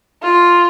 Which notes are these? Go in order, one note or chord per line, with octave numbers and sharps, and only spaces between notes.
F4